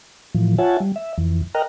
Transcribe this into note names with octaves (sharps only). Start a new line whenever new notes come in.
A2 E3 F3
F4 C#5 E5 F#5 G#5 A5
G3
E5
F2 E3
A#4 D#5 G5 A#5 F6 F#6